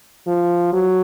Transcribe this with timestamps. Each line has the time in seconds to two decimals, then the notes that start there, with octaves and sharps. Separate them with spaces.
0.27 F3
0.73 F#3